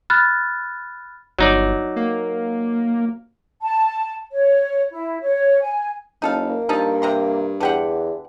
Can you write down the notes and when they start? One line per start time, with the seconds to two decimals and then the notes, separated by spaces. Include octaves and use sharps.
0.10 B5 F6 F#6 A6
1.39 G1 F#3 D#4 D5
1.96 A#3
3.61 A5
4.31 C#5
4.92 E4
5.21 C#5
5.62 G#5
6.22 F#1 D#4 A4 F5
6.49 A#3
6.69 G2 F3 D#4 A4
7.02 C3 A#5 C6
7.60 E2 D3 G4 F#5